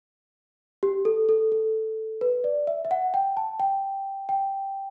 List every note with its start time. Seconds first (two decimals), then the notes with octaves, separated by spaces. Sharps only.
0.83 G4
1.05 A4
1.29 A4
1.52 A4
2.21 B4
2.44 D5
2.67 E5
2.85 E5
2.91 F#5
3.14 G5
3.37 A5
3.60 G5
4.29 G5